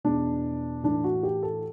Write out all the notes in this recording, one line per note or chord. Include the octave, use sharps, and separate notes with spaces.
E2 B2 D4
A2 E3 D4
F#4
G4
A4